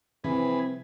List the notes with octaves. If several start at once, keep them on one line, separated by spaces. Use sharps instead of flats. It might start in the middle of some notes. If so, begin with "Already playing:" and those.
C3 E3 F3 G3 C4 G#4 B4